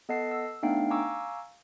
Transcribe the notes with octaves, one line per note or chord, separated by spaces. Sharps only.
B3 A4 D#5 F#5 A5 C7
E6
A3 B3 D4 D#4 F5 G5
F5 G#5 A#5 C#6 D6 E6